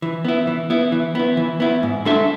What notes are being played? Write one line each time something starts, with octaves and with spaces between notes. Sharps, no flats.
E3
B3 E4
E3
B3 E4
E3
B3 E4
E3
B3 E4
G#2
G#3 D4 A4 E5